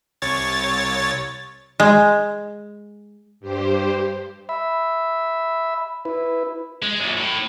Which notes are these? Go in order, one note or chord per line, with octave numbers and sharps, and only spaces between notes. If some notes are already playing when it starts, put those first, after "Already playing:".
C2 C#5 A6
G#3
G2 G4 C5
E5 B5
E4 B4
G#3
F#2 A#2
A2